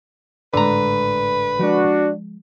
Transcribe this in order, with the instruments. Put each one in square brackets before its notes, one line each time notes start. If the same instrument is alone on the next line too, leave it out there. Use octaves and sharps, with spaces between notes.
[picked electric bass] G#1 A2 G#3 [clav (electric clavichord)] D3 A#5 [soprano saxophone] B4
[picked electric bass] F3 G#3 [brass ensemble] D4 F#4